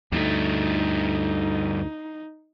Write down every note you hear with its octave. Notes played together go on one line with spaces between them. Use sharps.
D2 G2 A3 D#4